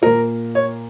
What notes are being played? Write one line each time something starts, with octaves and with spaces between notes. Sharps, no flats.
A#2 A#3 A#4
C#5